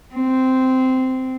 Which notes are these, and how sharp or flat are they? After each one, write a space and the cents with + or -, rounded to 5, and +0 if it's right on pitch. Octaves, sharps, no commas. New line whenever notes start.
C4 -10